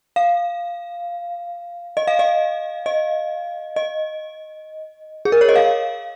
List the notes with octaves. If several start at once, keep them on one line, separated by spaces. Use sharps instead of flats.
F5
D#5
F5
D#5
D#5
D#5
G#4
A#4
C#5
D#5
F5